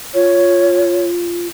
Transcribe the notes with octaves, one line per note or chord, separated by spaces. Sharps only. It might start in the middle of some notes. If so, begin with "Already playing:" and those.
F4 C#5